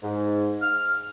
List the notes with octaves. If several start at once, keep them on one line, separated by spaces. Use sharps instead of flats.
G#2
F6